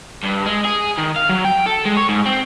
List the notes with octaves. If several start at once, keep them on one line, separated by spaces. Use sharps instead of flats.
G2
G#3
G#4
D#3
F5
F#3
G5
A4
G#3
C#5
G#2
C4